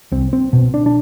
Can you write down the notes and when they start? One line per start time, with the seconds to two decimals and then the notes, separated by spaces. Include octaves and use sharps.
0.12 C2 C4
0.33 C4
0.53 B2
0.74 D4
0.86 D4